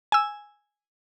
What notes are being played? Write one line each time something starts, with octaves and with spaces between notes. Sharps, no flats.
G#5 E6